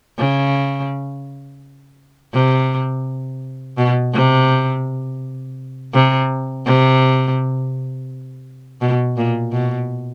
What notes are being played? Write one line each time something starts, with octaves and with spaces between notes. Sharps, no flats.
C#3
C3
B2
C3
C3
C3
B2
A#2
B2